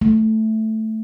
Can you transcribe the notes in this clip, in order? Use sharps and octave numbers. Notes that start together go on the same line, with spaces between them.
A3